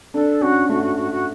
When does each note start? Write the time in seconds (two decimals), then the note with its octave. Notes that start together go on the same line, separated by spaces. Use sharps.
0.14 D4 A4
0.41 C#4 F#4
0.69 A3 F#4
0.83 F#4
0.97 F#4
1.11 F#4